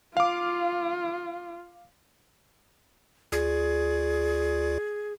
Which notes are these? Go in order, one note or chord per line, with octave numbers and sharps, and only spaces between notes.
F4 F5 D6
D2 F4 G#4 D5